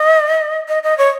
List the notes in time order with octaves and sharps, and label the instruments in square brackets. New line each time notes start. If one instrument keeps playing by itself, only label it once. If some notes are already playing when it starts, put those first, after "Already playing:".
Already playing: [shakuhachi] D#5
D#5
D#5
C#5